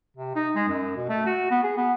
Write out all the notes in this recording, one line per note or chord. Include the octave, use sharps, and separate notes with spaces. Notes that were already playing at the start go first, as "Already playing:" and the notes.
C3
D#4
G#3
F#2
B2
A3
F#4
B3
G#4
B3